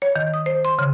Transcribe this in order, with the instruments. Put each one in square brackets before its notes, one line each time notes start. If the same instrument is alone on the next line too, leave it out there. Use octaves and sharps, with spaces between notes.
[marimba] C#5
D#3
D#6
C5
C6
C#3